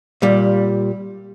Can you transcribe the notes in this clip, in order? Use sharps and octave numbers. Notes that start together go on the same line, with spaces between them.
A#2 G3